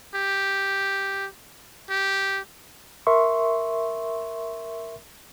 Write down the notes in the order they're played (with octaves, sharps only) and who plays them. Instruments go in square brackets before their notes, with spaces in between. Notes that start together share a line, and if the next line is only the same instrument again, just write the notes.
[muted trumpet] G4
G4
[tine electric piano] A#4 E5 C6 C#6